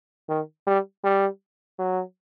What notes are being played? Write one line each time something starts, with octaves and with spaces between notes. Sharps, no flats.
D#3
G3
G3
F#3